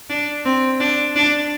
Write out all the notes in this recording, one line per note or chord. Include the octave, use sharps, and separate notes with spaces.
D4
C4
D4
D4